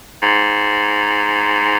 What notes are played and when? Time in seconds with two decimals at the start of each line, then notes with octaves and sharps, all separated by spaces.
0.22 G#2